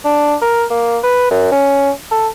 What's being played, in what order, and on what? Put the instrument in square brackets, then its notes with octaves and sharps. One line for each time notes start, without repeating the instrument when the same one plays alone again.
[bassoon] D4
A#4
A#3
B4
F#2
C#4
A4